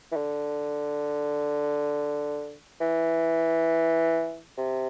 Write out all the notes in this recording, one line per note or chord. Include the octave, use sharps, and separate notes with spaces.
E3
D3
E3
C3